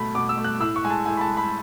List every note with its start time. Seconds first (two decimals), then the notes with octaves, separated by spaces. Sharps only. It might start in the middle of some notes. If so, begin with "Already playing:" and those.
Already playing: B2 A3 B5
0.15 B2 D6
0.29 E6
0.38 A3
0.44 F#6
0.60 A2 E6
0.76 C#6
0.84 G#3 G#5
0.91 A5
1.06 A2 G#5
1.17 B5
1.21 A5
1.30 G#3
1.37 B5